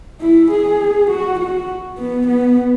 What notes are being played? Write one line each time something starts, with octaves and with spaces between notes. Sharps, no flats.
E4
G#4
F#4
F#4
B3
B3